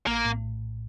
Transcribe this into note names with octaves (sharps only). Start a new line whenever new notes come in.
A#1 A#3
A2